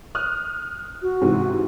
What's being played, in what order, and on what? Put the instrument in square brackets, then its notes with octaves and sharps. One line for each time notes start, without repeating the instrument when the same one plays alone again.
[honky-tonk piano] D#6 F6 F#6
[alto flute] F#4
[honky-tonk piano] G#2 C3 E3